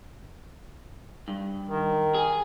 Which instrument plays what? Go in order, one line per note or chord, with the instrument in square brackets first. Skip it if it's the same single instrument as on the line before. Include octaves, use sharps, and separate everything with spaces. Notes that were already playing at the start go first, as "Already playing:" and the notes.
[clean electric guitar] G2
[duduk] D#3
[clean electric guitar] G#4